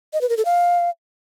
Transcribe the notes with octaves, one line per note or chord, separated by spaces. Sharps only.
D#5
B4
A#4
A4
F5